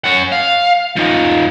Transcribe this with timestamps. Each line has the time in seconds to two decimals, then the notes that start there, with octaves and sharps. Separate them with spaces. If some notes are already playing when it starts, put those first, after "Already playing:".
0.04 C#4 F#5
0.32 F5
0.97 F3 D#4